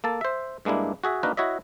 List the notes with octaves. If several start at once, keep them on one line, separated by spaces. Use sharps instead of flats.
A#3 A4 A5
C5 E5
G2 G#3 A#3 D4 E4
F#4 G#4 E5
A#3 D4 D#4 F#4 A#4 B4
E4 F#4 C#5 D#5 E5